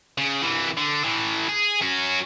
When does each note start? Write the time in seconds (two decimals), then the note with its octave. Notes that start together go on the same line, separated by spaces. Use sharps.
0.18 C#3
0.42 C2 E3
0.77 D3
1.04 A2 E3
1.48 G#4
1.82 C#4 F#4